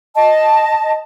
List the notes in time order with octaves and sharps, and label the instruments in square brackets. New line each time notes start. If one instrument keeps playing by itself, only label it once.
[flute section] D#5 A5